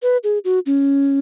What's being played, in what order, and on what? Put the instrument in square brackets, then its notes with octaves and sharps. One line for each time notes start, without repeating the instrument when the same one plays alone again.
[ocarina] B4
G#4
F#4
C#4